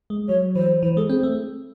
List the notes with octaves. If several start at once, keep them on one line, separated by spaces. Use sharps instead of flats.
G#3
F#3 C#5
E3 C5
E3 C5
G#3 A4
C4 G#4
A3